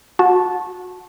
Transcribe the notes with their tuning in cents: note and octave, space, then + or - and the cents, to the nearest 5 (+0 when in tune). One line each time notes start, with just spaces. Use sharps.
F#4 -25 A5 -10